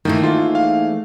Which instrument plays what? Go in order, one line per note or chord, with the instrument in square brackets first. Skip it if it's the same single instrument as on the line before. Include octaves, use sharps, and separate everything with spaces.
[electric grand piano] D#3 [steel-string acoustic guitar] E3 A3 A#3
[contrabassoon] G#2 [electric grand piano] F4
[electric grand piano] F5